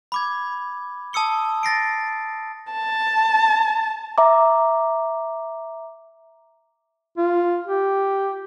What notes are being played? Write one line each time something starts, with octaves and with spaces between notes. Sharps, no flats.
B5 D6 G#6
A5 D#6 E6 C#7 G7
A6 A#6 C7 D7
A5
E5 A#5 D6
F4
G4